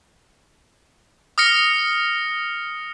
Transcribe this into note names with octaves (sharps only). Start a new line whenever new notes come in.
D#6 F6 A#6 C#7